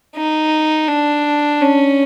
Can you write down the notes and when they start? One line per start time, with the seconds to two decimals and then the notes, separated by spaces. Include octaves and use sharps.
0.16 D#4
0.88 D4
1.61 C#4